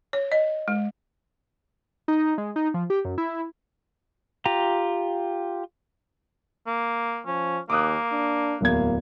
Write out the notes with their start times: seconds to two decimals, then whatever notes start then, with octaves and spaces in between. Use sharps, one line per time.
0.13 C#5
0.32 D#5
0.68 G#3
2.08 D#4
2.38 G#3
2.56 D#4
2.74 F3
2.90 G4
3.05 F#2
3.18 E4
4.46 F4 G4 A#5
6.67 A#3
7.26 F3 C#4
7.70 D#2 A#3 D6 D#6 F#6
8.12 D4
8.61 D1 E2 A#3 G#6